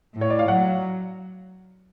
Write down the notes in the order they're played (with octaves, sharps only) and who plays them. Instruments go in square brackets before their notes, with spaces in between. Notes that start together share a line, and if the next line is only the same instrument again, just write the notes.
[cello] A2
[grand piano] C#5
D5
F5
[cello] F#3 [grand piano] F#5